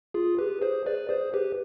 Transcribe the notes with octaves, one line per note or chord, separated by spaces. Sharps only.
F4 G#4
G4 B4
G#4 C5
B4 D5
G#4 C5
G4 B4